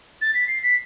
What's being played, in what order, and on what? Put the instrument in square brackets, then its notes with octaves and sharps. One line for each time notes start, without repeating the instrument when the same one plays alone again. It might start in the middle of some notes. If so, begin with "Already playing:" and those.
[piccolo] A6
B6
C7
B6